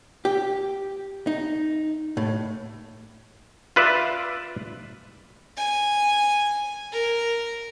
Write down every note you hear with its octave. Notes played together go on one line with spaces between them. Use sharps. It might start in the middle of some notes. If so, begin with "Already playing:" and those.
G4
D#4
A2
F4 B4 D5 E5
G#5
A#4